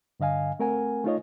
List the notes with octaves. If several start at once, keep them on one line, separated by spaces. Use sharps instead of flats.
G2 D3 D#5 F5 G#5
A3 C4 A#4 F#5 G#5
A3 D#4 F4 C#5 D#5